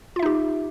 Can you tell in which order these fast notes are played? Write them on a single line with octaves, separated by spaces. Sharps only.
F4 E5 D#4 G4